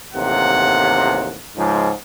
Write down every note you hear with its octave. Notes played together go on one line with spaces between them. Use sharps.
A1 D#2 C3 F#5
C#2 G#2 F3